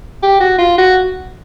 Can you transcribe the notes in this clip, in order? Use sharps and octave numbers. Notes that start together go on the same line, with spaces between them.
G4
F#4
F4
F#4